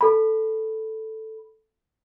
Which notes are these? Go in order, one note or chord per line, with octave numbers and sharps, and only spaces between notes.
A4 B5